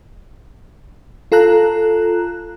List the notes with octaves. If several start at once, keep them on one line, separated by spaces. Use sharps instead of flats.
F4 A4 A#5 F#6